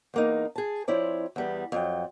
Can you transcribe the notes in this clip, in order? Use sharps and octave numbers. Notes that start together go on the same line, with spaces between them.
E2 A#3 D#4
G#4 A5
F3 C4 E4 C#5 D5
E2 G3 B3
F2 F#3 G5